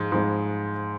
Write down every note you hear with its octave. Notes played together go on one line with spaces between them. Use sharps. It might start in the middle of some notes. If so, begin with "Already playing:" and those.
Already playing: G#2 F3 G#3
G#2 F3 G#3